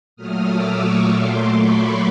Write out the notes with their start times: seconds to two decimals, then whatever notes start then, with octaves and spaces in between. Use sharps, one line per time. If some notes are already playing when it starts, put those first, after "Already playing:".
0.16 A#2 F#3 A3 D#6 F6
0.48 D6 E6
0.78 C#6 D#6
1.08 A#2 F#3 A3 C6 D6
1.55 B5 C#6